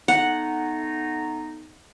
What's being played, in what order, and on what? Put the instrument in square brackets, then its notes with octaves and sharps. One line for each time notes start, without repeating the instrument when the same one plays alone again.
[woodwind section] A3 B3 D#4 [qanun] F#5